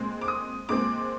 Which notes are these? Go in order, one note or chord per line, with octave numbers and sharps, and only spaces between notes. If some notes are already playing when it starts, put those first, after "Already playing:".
Already playing: A#2 G#3 C4
D6
D#6
A#2 G#3 C4 D6